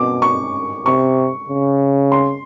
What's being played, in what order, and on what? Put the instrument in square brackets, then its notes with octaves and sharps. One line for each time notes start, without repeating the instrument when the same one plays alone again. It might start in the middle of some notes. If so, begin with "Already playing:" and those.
Already playing: [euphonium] B2 [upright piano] D6
[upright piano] C#6
[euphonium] C3 [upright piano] C#6
[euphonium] C#3
[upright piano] C6